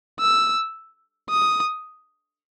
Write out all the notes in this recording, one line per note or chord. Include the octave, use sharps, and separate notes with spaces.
E6
D#6